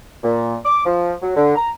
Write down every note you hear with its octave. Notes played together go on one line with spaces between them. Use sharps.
A#2
D6
F3
F#3
D3
A#5